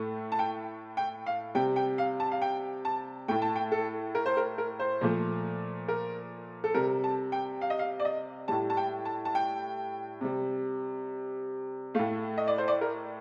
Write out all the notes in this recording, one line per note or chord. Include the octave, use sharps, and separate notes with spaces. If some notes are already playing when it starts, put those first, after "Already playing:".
Already playing: A2 A3
A5
G5
G5
F5
C3 G3 G5
G5
F5
A5
F5
G5
A5
A2 A3 G5
A5
G5
A4
A#4
C5
A#4
A#4
C5
A#2 F3 A3
A#4
A4
C3 G3 A#4
A5
G5
F5
D#5
F5
D5
D#5
A2 G3 A5
A5
G5
A5
A5
G5
C3 G3
A2 A3 F5
D#5
D5
C5
D5
A#4